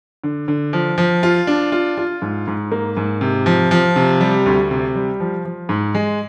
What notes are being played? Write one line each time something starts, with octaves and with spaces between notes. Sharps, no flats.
D3
D3
F3
F3
F4
D4
F4
F4
G#2
G#2
A#3
G#2
C3
F3
F3
C3
G3
D2
C3
G3
F3
F3
G#2
G#3